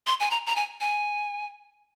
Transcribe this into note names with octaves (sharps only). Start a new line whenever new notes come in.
C6
G#5
A#5
A#5
G#5
G#5